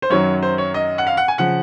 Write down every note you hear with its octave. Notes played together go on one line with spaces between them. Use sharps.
C5
F#2 D#3 F#3 C#5
C5
C#5
D#5
F#5
F5
F#5
G#5
C#3 F3 F#5